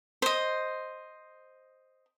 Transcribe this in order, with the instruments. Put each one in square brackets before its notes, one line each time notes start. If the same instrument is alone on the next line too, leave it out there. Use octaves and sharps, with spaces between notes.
[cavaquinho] C5 D#5